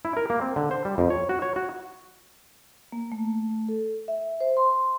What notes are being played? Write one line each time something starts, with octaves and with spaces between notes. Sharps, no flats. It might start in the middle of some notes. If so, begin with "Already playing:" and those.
E4
A#4
A#3
C4
D3
C5
G3
F2
C#5
F#4
C#5
F#4
A#3
A3
A4
E5
C5
C6